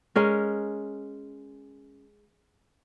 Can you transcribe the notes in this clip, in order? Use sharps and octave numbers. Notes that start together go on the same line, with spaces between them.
G#3 C#4 A#4